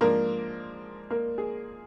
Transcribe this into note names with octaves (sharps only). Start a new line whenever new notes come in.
G#2 F3 G#3 A#3 D4 A#4
A#3 A#4
G#4